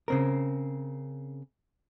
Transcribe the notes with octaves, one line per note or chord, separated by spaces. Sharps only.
C#3 C4 A#4